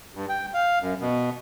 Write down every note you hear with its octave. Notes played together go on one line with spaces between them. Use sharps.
G2
G5
F5
F#2
B2